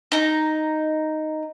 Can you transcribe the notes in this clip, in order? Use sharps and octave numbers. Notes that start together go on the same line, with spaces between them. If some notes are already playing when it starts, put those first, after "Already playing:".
D#4 A#5